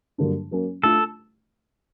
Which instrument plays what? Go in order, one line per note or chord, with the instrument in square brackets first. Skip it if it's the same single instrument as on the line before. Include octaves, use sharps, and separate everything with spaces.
[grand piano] G2 D3 F#3 A#3 D4
F#3 A#3 C#4
[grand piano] A3 D4 F4 [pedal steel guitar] A4